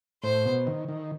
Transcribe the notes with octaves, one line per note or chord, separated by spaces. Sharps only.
A2 C5
B2
D#3
D#3